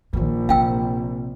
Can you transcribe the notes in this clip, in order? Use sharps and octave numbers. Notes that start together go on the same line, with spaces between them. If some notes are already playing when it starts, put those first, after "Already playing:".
A#1 D3 D#3
C3 F5 G5 E6